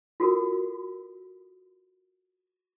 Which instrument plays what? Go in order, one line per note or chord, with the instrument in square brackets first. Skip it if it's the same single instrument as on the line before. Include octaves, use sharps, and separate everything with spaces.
[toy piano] F4 F#4 A4 A#4